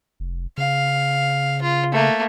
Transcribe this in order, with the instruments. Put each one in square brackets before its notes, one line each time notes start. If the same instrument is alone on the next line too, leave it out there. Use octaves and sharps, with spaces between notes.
[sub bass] F1
[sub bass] C#3 [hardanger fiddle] F5
[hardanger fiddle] F4
A3 A#3